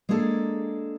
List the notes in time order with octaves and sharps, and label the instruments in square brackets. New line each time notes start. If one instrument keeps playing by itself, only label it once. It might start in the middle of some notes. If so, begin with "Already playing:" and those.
[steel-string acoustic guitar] G#3 A#3 D4 G#4 A4